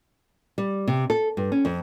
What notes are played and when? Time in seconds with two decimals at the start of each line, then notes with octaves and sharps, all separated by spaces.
0.58 G3
0.88 C3
1.10 A4
1.37 G2
1.52 C#4
1.65 F2